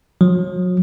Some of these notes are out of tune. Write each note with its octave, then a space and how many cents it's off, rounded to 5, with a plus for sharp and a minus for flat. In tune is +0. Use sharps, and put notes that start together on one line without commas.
F#3 -35